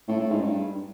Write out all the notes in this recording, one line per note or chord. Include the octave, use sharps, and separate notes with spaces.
A2
A2
G#2
G2